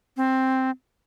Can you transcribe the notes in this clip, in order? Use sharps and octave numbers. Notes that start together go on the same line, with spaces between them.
C4